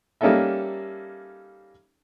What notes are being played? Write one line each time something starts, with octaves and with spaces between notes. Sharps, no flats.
G3 A#3 C#4 D#4 A4 E5